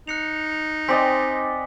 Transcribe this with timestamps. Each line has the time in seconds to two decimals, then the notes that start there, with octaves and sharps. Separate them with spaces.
0.07 D#4 F#6 C#7 F7
0.88 C4 D5 D#5 G#5 C6 B6